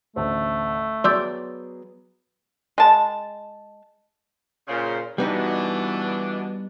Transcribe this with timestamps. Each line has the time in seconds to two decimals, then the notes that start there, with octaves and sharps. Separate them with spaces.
0.16 A1 D2 A3 C5
1.04 F#3 B3 G#4 D5 C6 E6 G6
2.78 G#3 A5
4.67 A#2 C#3 C5
5.18 B2 E3 G3 B3 D4 D#4